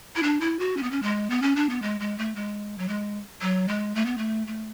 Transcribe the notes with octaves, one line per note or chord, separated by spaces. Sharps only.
E4
D4
E4
F#4
C#4
B3
C#4
G#3
B3
C#4
D4
B3
G#3
G#3
A3
G#3
F#3
G#3
F#3
G#3
A3
B3
A3
A3